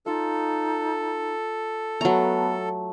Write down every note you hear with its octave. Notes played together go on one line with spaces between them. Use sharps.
D#4 F4 A4
F#3 A3 B3 A#5